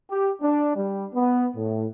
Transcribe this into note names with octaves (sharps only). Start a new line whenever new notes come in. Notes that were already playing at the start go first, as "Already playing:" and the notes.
G4
D4
G3
B3
A2